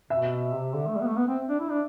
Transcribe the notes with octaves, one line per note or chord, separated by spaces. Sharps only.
B2 E5
C3
D3
A3
G3
B3
A3
B3
C4
D4
E4
D4